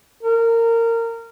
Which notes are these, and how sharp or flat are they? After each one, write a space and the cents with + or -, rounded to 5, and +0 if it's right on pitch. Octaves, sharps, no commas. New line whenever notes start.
A#4 -20